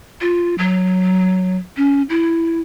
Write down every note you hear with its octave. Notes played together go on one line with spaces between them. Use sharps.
F4
F#3
C#4
E4